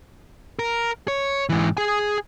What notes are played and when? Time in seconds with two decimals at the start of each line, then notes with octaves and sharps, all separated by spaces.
0.59 A#4
1.08 C#5
1.49 G#2 E3
1.77 G#4 G#5